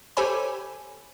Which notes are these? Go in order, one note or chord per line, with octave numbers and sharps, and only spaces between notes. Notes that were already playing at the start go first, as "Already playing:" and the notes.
G4 A4 C5 C#5 G#5 B5